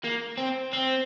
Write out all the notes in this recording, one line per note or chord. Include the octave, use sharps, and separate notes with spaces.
A#3
C4
C4